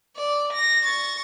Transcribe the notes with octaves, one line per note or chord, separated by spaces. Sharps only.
D5
A#6
C#6 A6